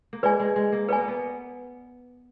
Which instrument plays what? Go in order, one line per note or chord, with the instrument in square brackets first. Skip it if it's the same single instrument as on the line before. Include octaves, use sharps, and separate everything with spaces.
[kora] A#3
[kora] G#3 [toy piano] B4 D5 G#5
[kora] G#3
G#3
A#3
[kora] B3 [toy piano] B4 D5 G#5
[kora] A#3
B3